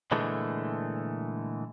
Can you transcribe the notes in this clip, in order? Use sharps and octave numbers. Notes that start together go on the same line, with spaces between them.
A#2 D3 E3 G#3 A3